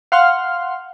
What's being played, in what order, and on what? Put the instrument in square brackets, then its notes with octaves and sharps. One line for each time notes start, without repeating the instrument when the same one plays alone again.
[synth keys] F5 F#5 C6 F6